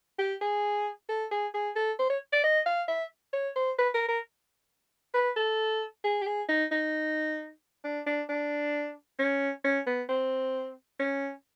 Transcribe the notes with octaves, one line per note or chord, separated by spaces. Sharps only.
G4
G#4
A4
G#4
G#4
A4
C5
C#5
D5
D#5
F5
E5
C#5
C5
B4
A#4
A#4
B4
A4
G#4
G4
G#4
D#4
D#4
D4
D4
D4
C#4
C#4
B3
C4
C#4